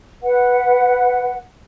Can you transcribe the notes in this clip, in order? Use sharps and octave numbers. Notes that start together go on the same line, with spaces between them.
B4 F#5